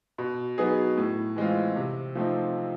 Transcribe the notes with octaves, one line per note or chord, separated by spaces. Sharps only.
B2
F#3 B3 D#4 G#4
A2
E3 G#3 C4 F4
C3
F3 A3 C4 D#4